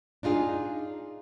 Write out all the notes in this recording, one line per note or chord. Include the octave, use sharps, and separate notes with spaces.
D4 D#4 F4 G#4